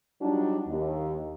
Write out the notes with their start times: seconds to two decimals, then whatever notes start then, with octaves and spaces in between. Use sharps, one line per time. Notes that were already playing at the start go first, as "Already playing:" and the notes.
0.22 F#3 G3 D4 D#4 F4 F#4
0.69 D#2